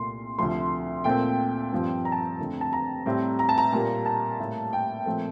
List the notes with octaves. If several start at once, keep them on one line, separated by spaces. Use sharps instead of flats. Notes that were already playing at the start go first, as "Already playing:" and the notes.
Already playing: C2 A#2 A3 C6
D2 C3 F3 A3 C6
A#2 A3 C4 G5
G2 F3 C4
A#5
A5
A#5
F2 D3 A3 C4
A5
A#5
A2 G3 C4
A#5
A5
A#5
A#2 G3 A#3
A5
A2 G3 A#3
G5
A#2 F3 A3 C4